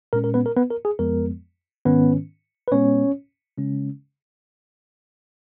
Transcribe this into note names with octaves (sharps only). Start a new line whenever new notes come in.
A#2 G#3 C#4 A#4
A#4
B3 B4
A#4
B3 B4
A#4
G#4
F2 F3 G#3 B3 A#4
G#2 D#3 G#3 B3 C#4 B4
B4
A#2 G#3 B3 C#4 C#5
C#3 G#3 C#4